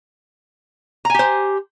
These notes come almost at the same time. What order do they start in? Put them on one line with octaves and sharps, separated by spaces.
A#5 G#5 G4 C5